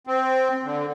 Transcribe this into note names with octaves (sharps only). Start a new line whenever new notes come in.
C4
D3